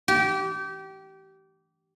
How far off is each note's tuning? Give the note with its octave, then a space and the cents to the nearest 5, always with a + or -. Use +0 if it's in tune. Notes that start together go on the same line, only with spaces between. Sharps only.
G4 -25